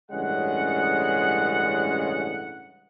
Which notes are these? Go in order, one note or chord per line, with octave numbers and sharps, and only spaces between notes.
A1 G2 C#3 G#3 F#5